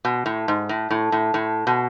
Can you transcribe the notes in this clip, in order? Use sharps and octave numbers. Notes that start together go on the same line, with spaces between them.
B2
A2
G#2
A2
A2
A2
A2
B2